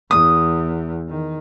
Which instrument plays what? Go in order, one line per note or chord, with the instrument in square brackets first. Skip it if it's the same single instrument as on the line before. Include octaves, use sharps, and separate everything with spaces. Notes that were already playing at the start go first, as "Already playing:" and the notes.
[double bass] E2 [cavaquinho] D#6
[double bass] D#3